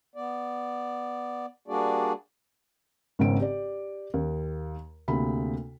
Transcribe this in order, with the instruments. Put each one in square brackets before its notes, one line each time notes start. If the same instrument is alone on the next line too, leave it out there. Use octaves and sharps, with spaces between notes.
[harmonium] B3 D5
G3 A#3 D4 F#4 G#4 D5
[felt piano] G#1 G#2 C#3 B3 C4 D7
G4 D5
D#2
D2 C3 A#3 B5